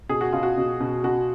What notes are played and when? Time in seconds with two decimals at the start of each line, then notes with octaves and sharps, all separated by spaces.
0.09 B2 G#4
0.21 F#4
0.33 B2 F4
0.43 F#4
0.58 B2
0.80 B2
1.04 B2 F#4